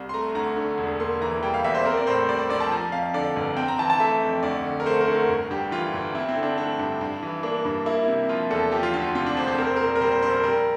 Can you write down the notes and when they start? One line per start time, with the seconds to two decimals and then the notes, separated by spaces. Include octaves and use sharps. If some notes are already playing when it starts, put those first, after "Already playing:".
Already playing: C2
0.09 C6
0.14 A3 A#5
0.35 D2 A#5
0.56 D3
0.78 E1
1.00 A#3 C6
1.21 E3 A#5
1.43 G3 G5
1.54 F5
1.64 E2 E5
1.75 C5
1.85 C4 A#4
1.97 D5
2.07 A2 C5
2.28 G3 D5
2.39 C5
2.49 A#1 D5
2.60 A5
2.71 F3 A#5
2.92 F2 F5
3.14 D3 D5
3.36 G1
3.57 C4 G5
3.68 A#5
3.79 E3 A5
3.90 A5
4.00 A3 E5
4.21 F2
4.43 D2 D5
4.64 D3
4.80 A#4
4.85 A3 C5
5.00 A#4
5.08 D2
5.14 A#4
5.29 G1
5.50 G2 G4
5.71 E3 F4
5.94 G1
6.15 C4 E4
6.28 C4
6.36 D3
6.43 D4
6.57 A3 D4
6.79 G2
7.01 G2
7.23 E3
7.43 A#3 D4
7.65 G2
7.86 A#3 E4
8.08 C3
8.29 F3 F4
8.50 E2 A4
8.72 F3 G4
8.83 F4
8.93 D2 F4
9.04 F4
9.15 C3 F4
9.26 D4
9.37 E1 C5
9.47 C5
9.58 C4 A#4
9.67 C5
9.76 A#2 A#4
9.96 A#4
10.01 G3 C5
10.12 C5
10.22 A#1 C5
10.33 A#4
10.43 G3 A#4